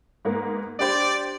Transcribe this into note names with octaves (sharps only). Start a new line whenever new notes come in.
G#2 A#3 B3
D4 G4 C5 D5